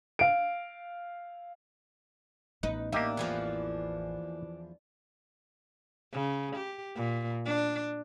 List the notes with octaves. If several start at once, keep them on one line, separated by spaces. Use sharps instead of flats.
F5 D7
A1 B3 D#4 B4
A#3 D4 D#4 G4 E5
E2 E3 F3
C#3
G4
A#2
D4